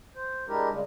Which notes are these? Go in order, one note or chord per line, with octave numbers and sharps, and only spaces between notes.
C5
G#3 D4 E4 G4 A#4
C#3 G3 G#3